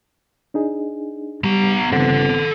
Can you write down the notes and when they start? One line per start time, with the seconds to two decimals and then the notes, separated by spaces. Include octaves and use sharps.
0.54 D4 D#4 G#4
1.44 G3 B3 A#5
1.93 G1 B3 C4 A4 F#5